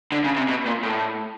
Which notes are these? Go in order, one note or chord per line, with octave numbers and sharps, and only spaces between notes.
D3
C#3
C3
B2
A#2
A2